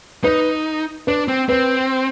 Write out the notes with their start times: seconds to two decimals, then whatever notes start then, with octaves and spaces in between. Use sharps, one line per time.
0.24 D#4 B4
1.07 D4 B4
1.28 C4
1.49 C4 B4